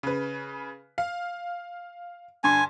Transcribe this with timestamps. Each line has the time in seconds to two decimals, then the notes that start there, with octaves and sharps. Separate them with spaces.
0.03 C#3 B4
0.98 F5
2.44 G2 D3 G#5 C6